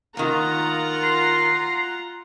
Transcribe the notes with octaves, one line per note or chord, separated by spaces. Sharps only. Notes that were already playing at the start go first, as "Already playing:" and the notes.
D#3 A#3 F4 F#5 A#5
C6